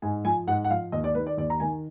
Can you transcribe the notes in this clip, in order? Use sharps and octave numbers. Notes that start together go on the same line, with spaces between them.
G#2 G#5
F3 G#5
G#2 F#5
F#5
F3 F5
D#2 D#5
D5
D#3 B4
D5
D#2 D5
A#5
D#3 G#5